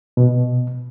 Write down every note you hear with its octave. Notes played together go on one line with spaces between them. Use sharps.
B2